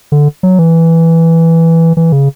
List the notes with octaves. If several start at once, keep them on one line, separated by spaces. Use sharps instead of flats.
D3
F#3
E3
E3
C#3